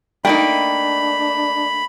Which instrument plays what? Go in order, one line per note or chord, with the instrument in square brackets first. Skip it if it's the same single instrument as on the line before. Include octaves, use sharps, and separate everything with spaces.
[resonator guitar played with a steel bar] A3 A#3 D#4 [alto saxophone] D4 [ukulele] G5 [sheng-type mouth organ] B5